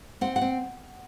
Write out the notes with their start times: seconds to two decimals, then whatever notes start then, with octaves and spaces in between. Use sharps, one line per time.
0.21 C4 F#5
0.36 F#5
0.41 C4